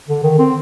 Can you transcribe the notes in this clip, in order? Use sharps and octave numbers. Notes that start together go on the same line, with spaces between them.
D3
D#3
C4